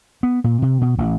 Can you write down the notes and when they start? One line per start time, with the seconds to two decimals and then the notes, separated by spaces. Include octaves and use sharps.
0.23 B3
0.44 A#2
0.62 C3
0.81 B2
0.98 A1